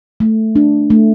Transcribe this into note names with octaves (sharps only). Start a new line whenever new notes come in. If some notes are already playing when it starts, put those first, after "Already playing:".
A3
D4
A3